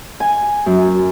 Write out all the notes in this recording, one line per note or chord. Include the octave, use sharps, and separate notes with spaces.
G#5
F#2